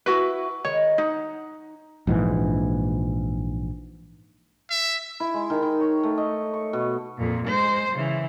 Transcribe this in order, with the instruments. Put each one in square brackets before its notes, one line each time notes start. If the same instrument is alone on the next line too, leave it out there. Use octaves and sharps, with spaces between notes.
[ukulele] E4 F#4 B4
[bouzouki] D#3 G#3 B4 [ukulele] C#5
[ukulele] D#4 [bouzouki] F#5
[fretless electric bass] A#1 G#2 D#3 E3
[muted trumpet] E5
[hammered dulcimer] E4
G#3
D#3
D#3
C#5
A3
D#5
C#6
B2
[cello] F2 A#2
G#3 C5
C#3 E3